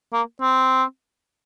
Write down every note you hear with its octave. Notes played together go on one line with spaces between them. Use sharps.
A#3
C4